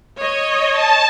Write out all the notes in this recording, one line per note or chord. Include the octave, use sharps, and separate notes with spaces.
C#5 D#5
A5